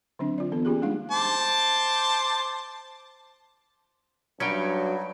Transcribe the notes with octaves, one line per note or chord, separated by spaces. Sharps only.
D3 F#3 C4 D4
F4 D5
E3 B3 A4
A#3 C#4 F4 G4 G#4
G3 G#3 D4 D#4 F5
C5 A5 D6
G2 F#3 C#4 D#4 E4 F#4 G5